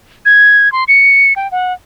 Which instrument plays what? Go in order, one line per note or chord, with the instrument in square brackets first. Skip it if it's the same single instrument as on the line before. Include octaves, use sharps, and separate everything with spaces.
[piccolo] G#6
C6
C#7
G5
F#5